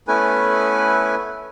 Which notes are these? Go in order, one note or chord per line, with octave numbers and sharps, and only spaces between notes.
A3 B3 C#4 E4 B4 G#5